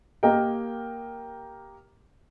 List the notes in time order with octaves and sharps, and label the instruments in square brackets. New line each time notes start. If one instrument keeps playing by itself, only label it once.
[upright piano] A#3 G4 A#4 D#5 G5